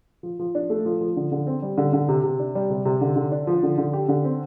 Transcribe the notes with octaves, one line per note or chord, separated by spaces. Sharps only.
F3
F3
D4
A3
F3
F3
D3
D3
C4
G3
D3
D3
C3
C3
D4
G3
C3
C3
D3
D3
D4
F3
D3
D3
G4
D3
C4